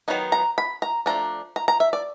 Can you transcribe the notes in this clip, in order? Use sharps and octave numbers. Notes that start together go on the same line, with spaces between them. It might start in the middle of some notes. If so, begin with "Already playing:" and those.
D#3 F#3 B3 D#4
A#5
B5
A#5
F3 A3 D4 A#5
A#5
A#5
E5
D5